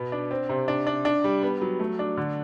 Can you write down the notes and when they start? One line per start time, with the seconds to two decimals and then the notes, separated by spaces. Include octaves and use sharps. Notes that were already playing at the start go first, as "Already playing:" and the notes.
Already playing: B2 B3
0.12 D4
0.31 C4
0.49 C3
0.68 D4
0.87 D4
1.05 D4
1.24 G3
1.43 B3
1.61 F#3
1.80 A3
1.99 D4
2.17 D3